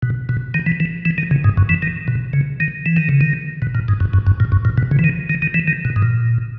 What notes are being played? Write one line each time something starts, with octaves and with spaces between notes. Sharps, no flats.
B2
B2
D#3
E3
E3
E3
D#3
C#3
G#2
F#2
E3
D#3
B2
C#3
D#3
E3
D#3
C#3
D#3
B2
A#2
G#2
F#2
F#2
F#2
A#2
F#2
A#2
B2
C#3
E3
D#3
D#3
D#3
E3
D#3
B2
G#2
A#2